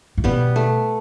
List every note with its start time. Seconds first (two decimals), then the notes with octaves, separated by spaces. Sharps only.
0.18 A2
0.24 B2 G3 B3
0.56 A3